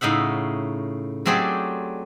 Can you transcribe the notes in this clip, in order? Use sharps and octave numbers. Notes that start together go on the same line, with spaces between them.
A2 C#3 D#4 E5 F#5
F#3 A3 C4 G4 G#4 D5